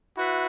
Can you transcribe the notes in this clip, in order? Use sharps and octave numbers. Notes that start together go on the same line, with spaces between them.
E4 F#4 B4 E5